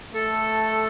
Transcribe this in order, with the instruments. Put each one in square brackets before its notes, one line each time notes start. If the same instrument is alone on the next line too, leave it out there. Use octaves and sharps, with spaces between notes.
[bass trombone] A3 [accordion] A4